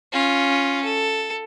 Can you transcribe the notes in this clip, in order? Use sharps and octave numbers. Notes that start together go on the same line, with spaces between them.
C#4 F4
A4